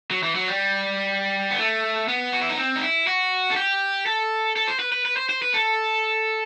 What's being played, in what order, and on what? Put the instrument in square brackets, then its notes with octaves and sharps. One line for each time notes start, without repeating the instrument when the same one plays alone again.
[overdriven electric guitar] F#3
E3
F#3
G3
B3
A3
B3
F#4
E4
D#4
C4
D#4
E4
F#4
A4
G4
A4
A4
C5
B4
B4
B4
C5
C5
B4
A4